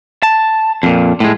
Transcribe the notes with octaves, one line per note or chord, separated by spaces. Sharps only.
A5
F2 A#2
A2 G#3